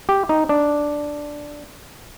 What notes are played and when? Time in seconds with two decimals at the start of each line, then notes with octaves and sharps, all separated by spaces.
0.09 G4
0.29 D#4
0.49 D4